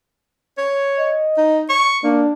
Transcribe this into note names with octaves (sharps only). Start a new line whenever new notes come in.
C#5
D#5
D#4
C#6
A#3 D4